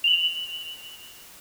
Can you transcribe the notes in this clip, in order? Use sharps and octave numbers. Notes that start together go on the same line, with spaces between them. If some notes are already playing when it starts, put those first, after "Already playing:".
F7 F#7